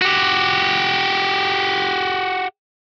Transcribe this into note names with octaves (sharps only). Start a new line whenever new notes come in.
F#4 G4